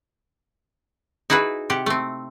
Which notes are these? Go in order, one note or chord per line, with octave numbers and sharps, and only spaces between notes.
D#4 E4 F#4 G#4 B4
C3 G4 F#5
A3 C4